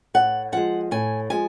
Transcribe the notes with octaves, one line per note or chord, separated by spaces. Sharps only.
A2 F#5
F3 G#3 F#5
A2 G#5
F3 G#3 G#5